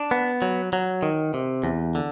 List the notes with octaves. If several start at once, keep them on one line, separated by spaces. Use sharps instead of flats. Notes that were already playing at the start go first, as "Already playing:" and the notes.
Already playing: D4
B3
F#3
F#3
D#3
C3
E2
D3